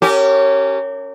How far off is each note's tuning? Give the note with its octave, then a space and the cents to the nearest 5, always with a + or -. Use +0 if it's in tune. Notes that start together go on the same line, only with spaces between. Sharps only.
C#4 +0 G4 -25 A#4 -35